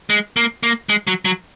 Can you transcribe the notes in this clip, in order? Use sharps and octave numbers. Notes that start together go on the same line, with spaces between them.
G#3
A#3
A#3
G#3
F#3
F#3